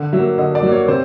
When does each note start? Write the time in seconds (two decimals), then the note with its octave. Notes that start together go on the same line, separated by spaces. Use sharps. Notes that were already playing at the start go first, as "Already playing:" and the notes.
Already playing: D3
0.13 F#3 E5
0.18 A#3
0.38 D3 D#5
0.55 D5
0.63 F#3 A#3
0.72 C#5
0.88 C3 C5